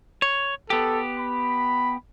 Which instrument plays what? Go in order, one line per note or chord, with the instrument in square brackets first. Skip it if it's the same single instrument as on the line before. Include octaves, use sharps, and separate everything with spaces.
[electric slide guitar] C#5
[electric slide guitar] B3 G4 [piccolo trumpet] A4
[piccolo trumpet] B5